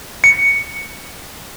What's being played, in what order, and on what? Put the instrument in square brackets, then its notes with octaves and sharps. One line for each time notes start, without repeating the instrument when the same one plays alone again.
[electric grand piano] C#7